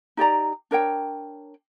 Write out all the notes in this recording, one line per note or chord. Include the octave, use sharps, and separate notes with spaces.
D#4 G4 D5 A#5
D4 A#4 C#5 G5